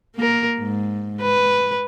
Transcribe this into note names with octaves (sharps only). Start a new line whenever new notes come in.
A#3 A#4
G#2
B4